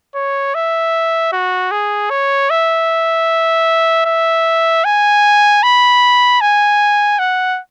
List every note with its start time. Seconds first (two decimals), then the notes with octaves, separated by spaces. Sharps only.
0.15 C#5
0.55 E5
1.32 F#4
1.71 G#4
2.10 C#5
2.50 E5
4.05 E5
4.84 G#5
5.63 B5
6.41 G#5
7.19 F#5